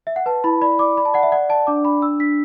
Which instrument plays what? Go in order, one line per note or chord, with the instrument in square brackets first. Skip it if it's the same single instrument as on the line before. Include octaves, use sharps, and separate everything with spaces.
[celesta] E5
F#5
B4 A5
E4 B5
D5 B5
D5 D6
D5 B5
A5
D5 F#5
E5
D5 F#5
D5 A5
D4 D6
D4 B5
D4 E6
D4 B6